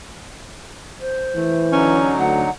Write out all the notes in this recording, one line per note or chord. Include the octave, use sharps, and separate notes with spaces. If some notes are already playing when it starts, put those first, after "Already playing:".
C5
E3 A3
D3 F#3 C#4 D#4
D2 F#5